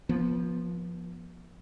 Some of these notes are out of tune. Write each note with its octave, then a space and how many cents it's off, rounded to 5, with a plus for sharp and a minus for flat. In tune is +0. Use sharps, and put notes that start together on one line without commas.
F3 +0 B3 -35